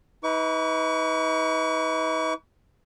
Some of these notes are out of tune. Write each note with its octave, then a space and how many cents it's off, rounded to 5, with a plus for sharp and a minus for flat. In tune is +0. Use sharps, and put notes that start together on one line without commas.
D#4 +40 B4 +0 C#6 +40